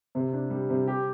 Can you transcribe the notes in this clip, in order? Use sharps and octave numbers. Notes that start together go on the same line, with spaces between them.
C3
D4
G3
C3
G4